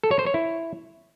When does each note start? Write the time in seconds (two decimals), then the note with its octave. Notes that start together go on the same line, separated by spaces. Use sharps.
0.04 A4
0.11 C#5
0.19 C5
0.26 C#5
0.34 E4